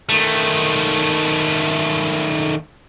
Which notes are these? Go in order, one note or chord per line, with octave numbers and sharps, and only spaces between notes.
D#3 A3